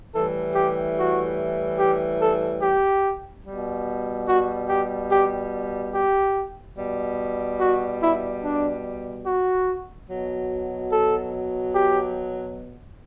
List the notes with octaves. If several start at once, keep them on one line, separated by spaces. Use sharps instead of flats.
A2 E3 G3 A4
G4
F#4
G4
A4
G4
B2 G3
F#4
G4
G4
G4
B2 G3
F#4
E4
D4
F#4
B2 F#3
A4
G4